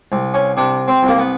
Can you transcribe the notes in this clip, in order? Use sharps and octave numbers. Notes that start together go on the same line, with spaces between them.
C2
C#4
C3 D4
C4
C2
A#3
B3